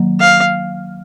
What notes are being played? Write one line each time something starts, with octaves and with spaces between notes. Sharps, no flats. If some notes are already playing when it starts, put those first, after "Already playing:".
Already playing: D#3 F#3 A#3
F5